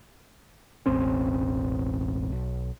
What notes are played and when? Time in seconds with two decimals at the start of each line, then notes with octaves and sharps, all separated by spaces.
0.86 E1 A1 C4 C#4
2.32 B1